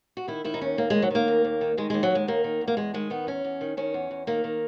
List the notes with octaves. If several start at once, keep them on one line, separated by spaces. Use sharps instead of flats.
F#4
D#3 E4
D#3 E4
D#4
D#2 C#4
D#2 A#3
D#3 G#3
F#3
D#3 A#3
D#2
D#2
D#3
D#3 G#3
D#2 G#3
F#3
D#2 G#3
D#3 A#3
D#3
E2
A#3
E2 G#3
D#3 G#3
D#3 B3
E2 C#4
E2
D#3
D#3 C#4
E2
E2
D#3 A#3
D#3